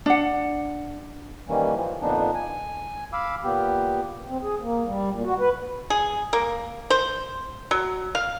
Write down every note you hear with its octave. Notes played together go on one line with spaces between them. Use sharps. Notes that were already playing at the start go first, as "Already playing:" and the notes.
D4 F#5
D#3 E3 G3 A#3 C#4
E3 F3
F2 A#2 D3 B3 D4 D#4
G#5
F5 B5 D6 E6
A#2 B3 G4
C4
G#4
A#3
G3
A#2
F#4
B4
G#4
A#3
C5
F#3
F5